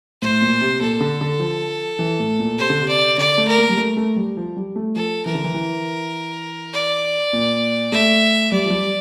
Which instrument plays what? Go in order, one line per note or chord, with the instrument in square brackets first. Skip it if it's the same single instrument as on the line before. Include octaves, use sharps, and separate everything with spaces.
[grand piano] A2 [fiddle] C5
[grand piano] A#2
C3
[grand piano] A#2 [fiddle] A4
[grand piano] D3
D3
F3
E3
A2
A#2
[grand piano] C3 [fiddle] C5
[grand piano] D3
C3
[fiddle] D5
[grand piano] D3 [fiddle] D5
[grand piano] A3
[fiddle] A#4
[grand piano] A#3
G3
A3
A3
G3
F3
G3
A3
[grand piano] F3 [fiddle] A4
[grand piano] E3 [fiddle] A#4
[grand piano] D3
E3
E3
[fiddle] D5
[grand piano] A#2
[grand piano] A3 [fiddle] E5
[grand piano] G3 [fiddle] D5
[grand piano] F3
G3